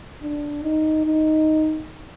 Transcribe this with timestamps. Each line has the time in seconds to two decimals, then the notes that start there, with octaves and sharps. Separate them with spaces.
0.23 D4
0.63 D#4
1.06 D#4